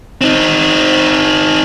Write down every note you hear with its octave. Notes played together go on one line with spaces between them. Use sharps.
C4 D#4